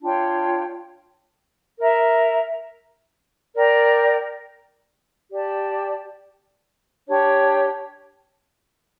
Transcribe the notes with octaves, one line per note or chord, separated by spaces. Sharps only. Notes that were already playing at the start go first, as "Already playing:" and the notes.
D4 F4 C#5 G5
A#4 E5 A#5
A#4 D5 G5
G4 D5 A5
D4 G4 C#5